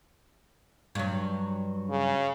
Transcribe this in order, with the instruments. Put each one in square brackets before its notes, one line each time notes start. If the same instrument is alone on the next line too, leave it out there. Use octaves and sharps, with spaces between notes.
[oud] G2 F#3
[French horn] C#3